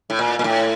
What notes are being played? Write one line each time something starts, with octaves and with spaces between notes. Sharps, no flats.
A2
A#2
A#2
A2